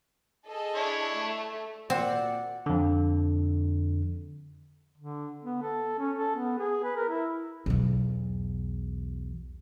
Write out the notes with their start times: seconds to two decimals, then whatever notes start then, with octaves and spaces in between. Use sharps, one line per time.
0.46 G#4 A4 D#5
0.75 D4 E4 C#5
1.12 A3
1.90 A#2 C4 F#4 D5 F#5
2.66 F2 D3
4.98 D3
5.43 B3
5.62 A4
5.99 C#4
6.17 A4
6.36 B3
6.59 G#4
6.84 B4
6.96 A#4
7.10 E4
7.66 B1 E2